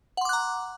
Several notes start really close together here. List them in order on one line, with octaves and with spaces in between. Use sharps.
F#5 C6 D6 F#6 A#5